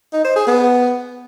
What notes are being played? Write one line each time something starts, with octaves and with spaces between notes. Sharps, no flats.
D#4
C5
G#4
B3